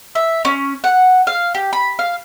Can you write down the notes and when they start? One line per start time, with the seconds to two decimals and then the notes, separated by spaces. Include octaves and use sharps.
0.15 E5
0.45 C#4
0.84 F#5
1.27 F5
1.55 G4
1.73 B5
1.99 F5